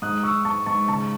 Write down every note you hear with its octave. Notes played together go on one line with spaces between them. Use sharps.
G#2 D#6 F#6
G#2 C#6 E6
G#2 A5 C#6
G#2 A5 C#6
C#3 A5 C#6